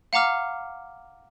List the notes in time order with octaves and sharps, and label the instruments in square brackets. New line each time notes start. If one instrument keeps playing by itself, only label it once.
[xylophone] F5 F#5 A#5 D6 F6